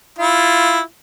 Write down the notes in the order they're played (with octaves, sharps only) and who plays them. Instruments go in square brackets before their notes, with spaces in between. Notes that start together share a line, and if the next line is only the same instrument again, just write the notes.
[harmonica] E4 F4